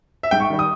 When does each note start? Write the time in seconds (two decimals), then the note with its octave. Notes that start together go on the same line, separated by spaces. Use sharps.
0.23 E5
0.31 G#2 G5
0.40 C#6
0.50 D#3 G3
0.59 D#6